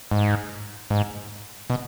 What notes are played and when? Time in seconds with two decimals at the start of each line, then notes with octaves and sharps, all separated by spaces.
0.11 G#2
0.90 G#2
1.70 B2